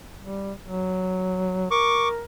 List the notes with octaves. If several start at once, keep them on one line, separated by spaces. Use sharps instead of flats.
G3
F#3
A#4 C#6 D6